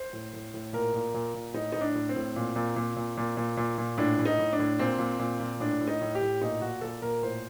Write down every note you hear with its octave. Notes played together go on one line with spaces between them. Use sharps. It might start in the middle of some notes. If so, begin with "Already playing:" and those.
Already playing: C5
A2
A2
A2
A#2 A#4
A#2
A#2
A#2
A2 D#4
A2 D#4
D4
A2
C4
A2
A#2
A#2
A#2
A#2
A#2
A#2
A#2
A#2
A2 D4
A2
D#4
A2
D4
A2
A#2 C4
A#2
A#2
A#2
A2 D4
A2
D#4
A2
G4
A2
A#2 D#4
A#2 F#4
A#2 A4
A#2 A#4
A2 C5